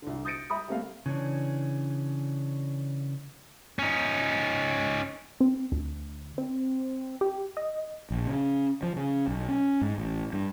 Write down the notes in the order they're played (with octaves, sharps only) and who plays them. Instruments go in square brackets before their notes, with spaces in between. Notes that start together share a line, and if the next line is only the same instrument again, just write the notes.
[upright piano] C2 D3
D#6 G6 A6 A#6 C#7 D7
E5 A#5 B5 D#6
G3 A3 A#3 C4 E5 F5
[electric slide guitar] C#3 E3 C#4 D4
[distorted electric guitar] C#4 D#4
[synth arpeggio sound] C4
D2
C4
G4
D#5
[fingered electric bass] A#1
C#3
F3
C#3
B1
C#4
G#2
A1
G2